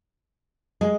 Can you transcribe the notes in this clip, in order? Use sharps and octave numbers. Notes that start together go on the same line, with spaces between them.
G#3